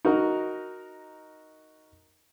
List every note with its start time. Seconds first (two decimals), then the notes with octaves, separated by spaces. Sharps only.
0.05 D#4 F#4 A#4